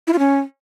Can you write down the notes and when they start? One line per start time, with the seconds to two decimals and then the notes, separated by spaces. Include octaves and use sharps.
0.07 E4
0.13 F4
0.19 C#4